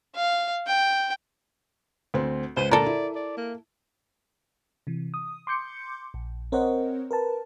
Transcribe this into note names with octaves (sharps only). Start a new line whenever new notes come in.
F5
G5
D2 C4
C#2 B4 C5 D#7
A#2 D3 A4 A#4 D5
E4
D5
A#3
C3 E3
D#6
C6 D6 G6 C#7
A#1
C4 A#4 C5 C#5 D#5 F#5
A#4 B4 A5